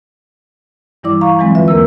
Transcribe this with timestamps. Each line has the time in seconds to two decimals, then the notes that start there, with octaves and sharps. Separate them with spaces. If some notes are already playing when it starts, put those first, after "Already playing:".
1.03 G2 E3 G3 E4 D5 D6
1.21 F5 A#5 C#6
1.39 E3 F#3 G#3 C4
1.55 D3 F4 B4 E5
1.68 E2 A#3 A#4 E6